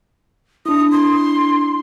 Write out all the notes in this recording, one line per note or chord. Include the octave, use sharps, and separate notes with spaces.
D4 E4 D#6
C6